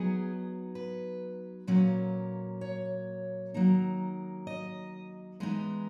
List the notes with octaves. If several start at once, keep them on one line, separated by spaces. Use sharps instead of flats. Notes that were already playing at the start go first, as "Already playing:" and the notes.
Already playing: F#3 B3 D#4 G#4
B4
A#2 F#3 A#3 C#4
C#5
D#3 F#3 A#3 D#4
D#5
E3 G#3 B3 D#4